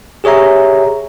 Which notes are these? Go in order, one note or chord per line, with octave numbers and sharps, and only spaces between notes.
G4 G#4 C#5 E5 A#5